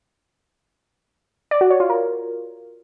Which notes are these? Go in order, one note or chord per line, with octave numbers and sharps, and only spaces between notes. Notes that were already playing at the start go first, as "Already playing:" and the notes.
D5
F#4
C#5
F4
A#4